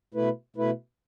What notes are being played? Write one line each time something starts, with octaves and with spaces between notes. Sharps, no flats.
B2 A3 E4 B4
B2 A3 E4 B4